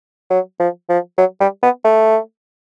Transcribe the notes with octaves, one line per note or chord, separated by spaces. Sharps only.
F#3
F3
F3
F#3
G3
B3
A3